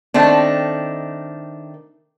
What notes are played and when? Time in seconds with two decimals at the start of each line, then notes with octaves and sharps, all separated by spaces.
0.14 D#3 A3 C4 D4